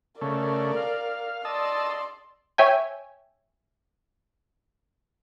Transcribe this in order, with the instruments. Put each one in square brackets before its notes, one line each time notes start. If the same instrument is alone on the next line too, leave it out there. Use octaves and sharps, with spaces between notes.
[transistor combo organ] C#3 A3 [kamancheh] A#4 D5
[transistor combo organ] F5
[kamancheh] D5 C6 [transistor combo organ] D#5 A5 E6
[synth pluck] C#5 E5 G5 G#5